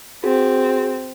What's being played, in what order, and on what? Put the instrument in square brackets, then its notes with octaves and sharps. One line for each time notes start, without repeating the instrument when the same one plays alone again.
[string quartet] C4 [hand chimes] F#4 G#4